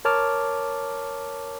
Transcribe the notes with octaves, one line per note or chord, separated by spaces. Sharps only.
A#4 C#5 A5 D6 F6